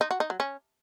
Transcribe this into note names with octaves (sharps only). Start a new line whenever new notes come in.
D#4
F#4
D#4
F#3
C#4